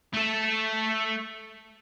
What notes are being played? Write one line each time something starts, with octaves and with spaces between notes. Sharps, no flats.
A3 A4